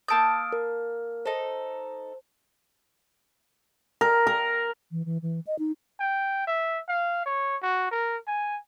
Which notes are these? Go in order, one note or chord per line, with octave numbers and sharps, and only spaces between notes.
A#3 A5 D#6 E6 G6 D7
A#4
D#4 A4 C5
A#4
A#4
E3
E3
E3
D#5
D#4
G5
E5
F5
C#5
F#4
A#4
G#5